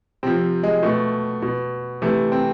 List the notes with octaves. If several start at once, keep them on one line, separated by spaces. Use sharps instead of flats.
C3 F3 C4
G#3
B2 A3
B2
C3 E3 A3
C4